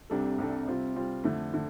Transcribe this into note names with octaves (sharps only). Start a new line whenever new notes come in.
C2 C3 G3 D4 A4
C2 C3 G3 D4 A4
C3 G3 C4 F4
C3 G3 C4 F4
F2 D3 A3
D3 A3